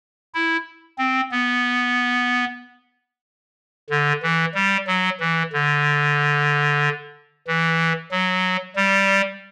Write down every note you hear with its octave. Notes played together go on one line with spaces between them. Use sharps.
E4
C4
B3
D3
E3
G3
F#3
E3
D3
E3
F#3
G3